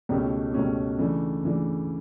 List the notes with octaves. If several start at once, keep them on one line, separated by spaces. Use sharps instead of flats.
C#2 B2 A3 C#4 G4
C#2 B2 A3 C#4 G4
C#3 E3 A3 D4
C#3 E3 A3 D4